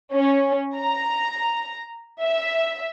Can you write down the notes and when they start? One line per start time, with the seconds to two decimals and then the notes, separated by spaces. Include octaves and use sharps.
0.12 C#4
0.76 A#5
2.23 E5